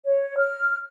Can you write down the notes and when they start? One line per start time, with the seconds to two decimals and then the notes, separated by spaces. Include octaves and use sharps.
0.06 C#5
0.38 F6